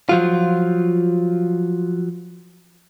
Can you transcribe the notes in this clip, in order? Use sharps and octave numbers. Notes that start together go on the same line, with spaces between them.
F3 F#3 F4